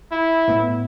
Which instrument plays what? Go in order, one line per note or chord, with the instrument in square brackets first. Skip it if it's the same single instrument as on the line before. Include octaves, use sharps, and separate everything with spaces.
[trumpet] E4
[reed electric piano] A2 B3